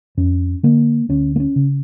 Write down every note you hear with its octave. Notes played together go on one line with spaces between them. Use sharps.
F2 C#4
D3 A#3
D2 C#4
A#3
C#4
C#3